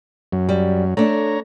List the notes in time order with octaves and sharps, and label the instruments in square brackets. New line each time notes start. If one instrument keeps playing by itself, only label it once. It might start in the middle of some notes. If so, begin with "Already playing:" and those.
[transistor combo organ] F#2 F#3
[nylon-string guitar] G3
[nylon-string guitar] A3 D4 [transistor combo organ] C#5 A#5